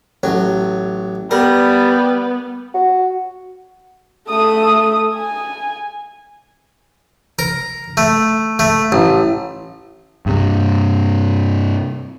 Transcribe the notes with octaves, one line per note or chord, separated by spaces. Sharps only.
A1 F#3
G3 B3 A#4
F#4
A3 D#6
G#5
A#4
A3
A3
A1
G2 C3